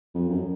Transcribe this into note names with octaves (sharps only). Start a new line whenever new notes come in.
F2
F#2